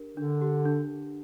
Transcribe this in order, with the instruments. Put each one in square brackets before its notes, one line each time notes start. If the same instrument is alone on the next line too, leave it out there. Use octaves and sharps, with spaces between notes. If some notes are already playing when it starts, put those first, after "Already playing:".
Already playing: [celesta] D4 G4 A#4
[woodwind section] D3 [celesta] D4
[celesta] G4
D4